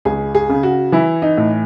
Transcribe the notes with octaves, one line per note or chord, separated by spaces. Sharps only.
C#2 G#4
G#4
C#3
F#4
E3 E4
D#4
A2